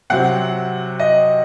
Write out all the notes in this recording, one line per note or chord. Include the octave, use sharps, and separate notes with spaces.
C3 F#3 C4 F#5
D#5